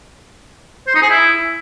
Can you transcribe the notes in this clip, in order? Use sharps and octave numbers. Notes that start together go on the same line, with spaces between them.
C5
D#4
G#4
E4